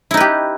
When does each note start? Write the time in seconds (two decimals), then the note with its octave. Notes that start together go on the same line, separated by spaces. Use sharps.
0.11 E4
0.14 D#4
0.17 B4
0.20 G4